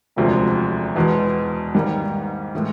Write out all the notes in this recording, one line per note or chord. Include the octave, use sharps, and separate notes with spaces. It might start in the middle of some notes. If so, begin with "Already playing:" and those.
E1 D2 C3 F3 G#3
E2 B2 G#3 B3
G#2 D#3 G3 A#3
A2 E3 G#3